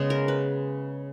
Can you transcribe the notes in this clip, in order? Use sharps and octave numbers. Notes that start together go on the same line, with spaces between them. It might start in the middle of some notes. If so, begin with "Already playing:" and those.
Already playing: C#3 G#3 B3 G#4
A#4
B4